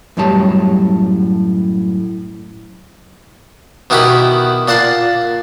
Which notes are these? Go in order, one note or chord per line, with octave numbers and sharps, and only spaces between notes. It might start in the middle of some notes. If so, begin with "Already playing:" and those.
F#2 A2 G3 C#5 A5
B2 D#3 E4 F#4 G4
A#2 D5 F#5 A5 C6